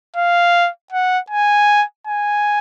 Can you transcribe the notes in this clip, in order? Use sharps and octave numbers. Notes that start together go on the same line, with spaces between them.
F5
F#5
G#5
G#5